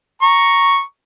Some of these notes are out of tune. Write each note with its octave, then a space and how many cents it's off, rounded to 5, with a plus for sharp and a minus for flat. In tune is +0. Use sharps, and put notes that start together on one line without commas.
A#5 +0 C#6 +0